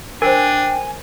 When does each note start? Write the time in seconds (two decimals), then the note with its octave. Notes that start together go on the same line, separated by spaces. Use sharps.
0.22 D4 A#4 C5 G5 G#5